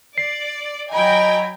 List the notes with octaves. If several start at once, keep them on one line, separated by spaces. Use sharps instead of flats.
D5 C7
F#3 D#5 G5 G#5 A#5 B5